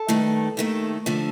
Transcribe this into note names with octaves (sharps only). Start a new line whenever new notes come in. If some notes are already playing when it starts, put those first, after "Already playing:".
Already playing: A4
G2 D#3 A3
D#2 D#3 A3
D3 F3 A3